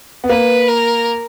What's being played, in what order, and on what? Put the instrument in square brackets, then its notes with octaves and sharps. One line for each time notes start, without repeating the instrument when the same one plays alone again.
[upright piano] B3
[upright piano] A#3 [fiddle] B4
[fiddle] A#4